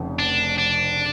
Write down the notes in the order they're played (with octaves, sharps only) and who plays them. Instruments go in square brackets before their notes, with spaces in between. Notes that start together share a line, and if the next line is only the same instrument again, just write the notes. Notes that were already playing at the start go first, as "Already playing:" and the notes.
Already playing: [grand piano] F1 F2 C#3 F3
[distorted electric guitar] D4
D4